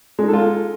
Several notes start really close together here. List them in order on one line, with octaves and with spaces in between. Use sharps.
G#3 D#4 A4 F4